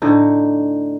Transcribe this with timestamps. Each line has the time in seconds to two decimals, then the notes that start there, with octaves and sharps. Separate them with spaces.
0.02 A2 D3 D#4